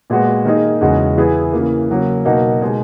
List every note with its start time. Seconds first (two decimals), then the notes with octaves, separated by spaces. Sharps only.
0.10 A#2 G#3 B3 F#4
0.45 D#3 A#3 D#4 G#4
0.81 E2 C#3 G#3 D#4 F#4
1.17 E3 B3 E4 G#4
1.53 C#3 E3 A#3
1.90 C#3 F#3 A#3
2.25 B2 F#3 A#3 D#4 F#4
2.62 B2 G#3 D#4 G#4